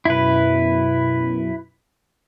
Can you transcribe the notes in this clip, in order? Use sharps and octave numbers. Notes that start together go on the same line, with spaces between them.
F#2 B2 E4 B4